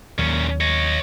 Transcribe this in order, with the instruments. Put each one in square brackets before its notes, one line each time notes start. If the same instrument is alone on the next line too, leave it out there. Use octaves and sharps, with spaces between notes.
[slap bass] D#2 F#3 [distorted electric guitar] A#2 C#4
[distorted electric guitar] C#5 D#5